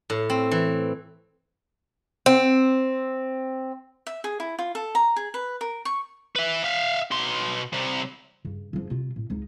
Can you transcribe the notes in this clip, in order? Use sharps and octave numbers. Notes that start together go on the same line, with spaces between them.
A2
C4
E3
C4
E5
G#4
E4
F4
A4
A#5
G#4
B4
A#4
C#6
B4 E5
E5 F5
B2 C6
C3 G3
G2 C#3
C#3 F3
C3 F4
A2
C#2 D#4